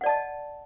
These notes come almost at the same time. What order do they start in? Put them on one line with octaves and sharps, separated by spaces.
F#5 D5 A5 D#5